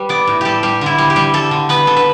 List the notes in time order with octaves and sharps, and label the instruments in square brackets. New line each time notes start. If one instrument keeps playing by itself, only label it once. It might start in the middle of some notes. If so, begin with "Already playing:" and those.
Already playing: [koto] G3 G4 B4
B3 D5
A2
G3 G4 A4
G3 G4
D3 E4
G3
G4
G3
G3 A4
D3
B3 B4
D3 A4
B4